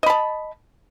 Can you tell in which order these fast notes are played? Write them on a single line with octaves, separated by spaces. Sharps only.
D#5 B5 A5